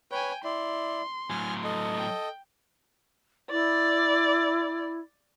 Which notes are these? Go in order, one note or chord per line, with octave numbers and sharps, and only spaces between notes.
B4 C#5 G5 G#5
E4 D5 C6
A2 F#3 G#5 F6
A4 D#5
G5
E4 D5